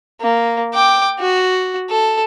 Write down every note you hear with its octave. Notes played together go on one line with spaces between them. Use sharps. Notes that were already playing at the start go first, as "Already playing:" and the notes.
A#3
G5 D6
F#4
A4